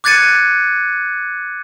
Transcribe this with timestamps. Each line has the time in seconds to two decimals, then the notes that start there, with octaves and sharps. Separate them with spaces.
0.04 D6 F#6 G#6 A6 C#7 D#7